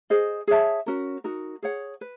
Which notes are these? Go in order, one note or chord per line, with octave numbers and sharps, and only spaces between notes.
G#4 C5 D#5
G#4 C#5 E5 A5
C#4 F#4 A#4
D#4 F#4 A#4
G#4 C#5 F#5
B4